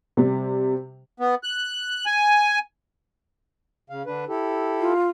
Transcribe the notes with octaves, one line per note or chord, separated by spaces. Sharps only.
C3 G3
B3
F#6
G#5
C#3 F5
D3 D4 B4
E4 G4 A4
F4